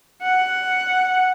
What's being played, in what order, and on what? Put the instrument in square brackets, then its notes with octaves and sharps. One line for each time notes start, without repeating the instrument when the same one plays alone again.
[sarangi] F#5